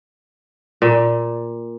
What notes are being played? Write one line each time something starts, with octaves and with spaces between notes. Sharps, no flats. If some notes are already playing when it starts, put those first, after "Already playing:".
A#2